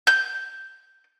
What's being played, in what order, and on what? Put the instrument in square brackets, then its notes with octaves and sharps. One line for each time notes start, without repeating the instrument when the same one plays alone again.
[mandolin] G6